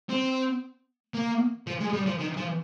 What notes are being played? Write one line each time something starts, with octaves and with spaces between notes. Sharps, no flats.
C4
A#3
F3
G#3
G3
F3
D#3
F3